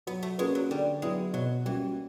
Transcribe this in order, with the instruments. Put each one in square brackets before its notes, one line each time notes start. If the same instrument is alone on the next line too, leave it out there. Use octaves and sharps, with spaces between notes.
[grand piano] F#3 [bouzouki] B3
[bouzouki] A3
[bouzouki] G#3 [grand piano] A#3 C#4 F#4 B4
[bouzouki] F#3
[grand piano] D3 [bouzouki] G3
[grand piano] F#3 B3 E4 [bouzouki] G#3
[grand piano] B2 [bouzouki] F#3
[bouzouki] E3 [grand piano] G3 A#3 C#4 F#4